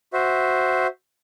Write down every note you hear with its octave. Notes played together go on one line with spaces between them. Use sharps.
F#4 C5 E5